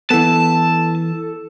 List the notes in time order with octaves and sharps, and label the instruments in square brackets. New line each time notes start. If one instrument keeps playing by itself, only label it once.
[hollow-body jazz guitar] E3 B3 [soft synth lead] A4 [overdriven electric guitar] A5